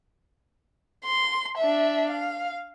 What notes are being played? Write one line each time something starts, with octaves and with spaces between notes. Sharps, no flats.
C6
D4 E5
F5